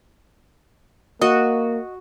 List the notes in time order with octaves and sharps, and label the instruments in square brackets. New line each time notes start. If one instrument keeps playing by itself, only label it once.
[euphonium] A#3 [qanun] F#4 [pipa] D#5